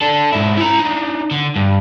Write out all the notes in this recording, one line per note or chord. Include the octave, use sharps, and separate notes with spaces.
D4 A4
G#2 E4
E4 A#5
D4 D#4
D3
G2